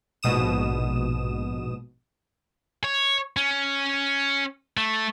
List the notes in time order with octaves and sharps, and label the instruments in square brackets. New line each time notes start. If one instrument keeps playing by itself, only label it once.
[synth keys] A#1 G#2 B2 D#6 E7
[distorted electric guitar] C#5
C#4
A3